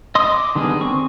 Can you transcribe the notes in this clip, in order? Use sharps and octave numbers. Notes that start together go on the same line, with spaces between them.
D#5 C6 D#6
D6
D3 D#3 G3 B3 G#4
C4 C#6